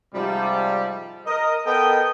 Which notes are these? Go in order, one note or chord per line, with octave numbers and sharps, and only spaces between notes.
G#2 C3 F3 G3
A#4 D#5
B3 A4 A#4 D#5 G5